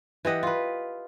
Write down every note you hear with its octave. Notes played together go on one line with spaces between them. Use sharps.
E3 G4 D#5 F#5
F4 B4